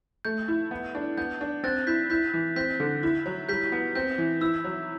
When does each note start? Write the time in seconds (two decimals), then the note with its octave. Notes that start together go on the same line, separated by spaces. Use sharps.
0.25 A3 G6
0.48 E4
0.71 B3
0.95 D4
1.18 B3 G6
1.41 D4
1.64 C4 F#6 A6
1.87 E4 G6 B6
2.10 E4 G6 B6
2.33 E3
2.56 C4 G6 B6
2.80 D3
3.03 E4
3.26 F#3
3.49 G3 G6 B6
3.72 B3
3.95 C4 G6
4.18 E3
4.41 E4 E6
4.64 F#3